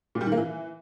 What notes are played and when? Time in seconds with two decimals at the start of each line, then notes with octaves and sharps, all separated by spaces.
0.15 A#2
0.21 G3
0.26 D#3
0.32 A#3
0.37 E3